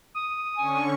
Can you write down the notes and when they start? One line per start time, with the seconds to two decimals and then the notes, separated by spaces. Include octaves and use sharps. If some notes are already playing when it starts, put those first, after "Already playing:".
0.15 D#6
0.56 D3 C#4 G#5 C#6